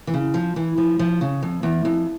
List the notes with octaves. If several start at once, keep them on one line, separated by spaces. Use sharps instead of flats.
E3
C#3
F3
E3
F3
F3
C#3
F2
E2
F2